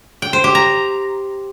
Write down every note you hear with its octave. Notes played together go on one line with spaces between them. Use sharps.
G5
C5
G4
A#5